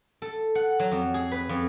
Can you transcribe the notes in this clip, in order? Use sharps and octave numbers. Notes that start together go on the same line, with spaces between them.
A4
F#5
F#3
F2
G#4
B4
F2